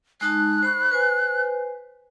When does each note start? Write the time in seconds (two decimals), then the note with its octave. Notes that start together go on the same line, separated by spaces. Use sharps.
0.21 G#3 D#4 A5 F#6
0.63 C5 B5 C#6
0.91 B4 C5 G#5